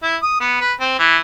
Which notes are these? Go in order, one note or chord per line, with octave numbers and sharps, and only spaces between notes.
E4
D#6
B3
B4
C4
E3